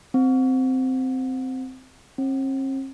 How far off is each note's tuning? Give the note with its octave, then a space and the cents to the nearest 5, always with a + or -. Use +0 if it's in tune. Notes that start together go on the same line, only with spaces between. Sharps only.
C4 -10
C4 +45